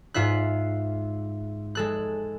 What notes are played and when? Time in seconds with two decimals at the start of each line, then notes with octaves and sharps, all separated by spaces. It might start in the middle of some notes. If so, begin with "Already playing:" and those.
0.14 G#2 F4 E5 F#6
1.75 G#3 A4 F#6